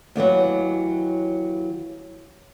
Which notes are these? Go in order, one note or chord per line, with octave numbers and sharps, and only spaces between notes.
D#2 D3 E3 F#3